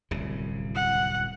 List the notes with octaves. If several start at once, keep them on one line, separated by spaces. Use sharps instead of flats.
D1 C2 C#3
F#5